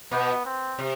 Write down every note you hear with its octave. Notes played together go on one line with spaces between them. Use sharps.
B2 B3
C4
C3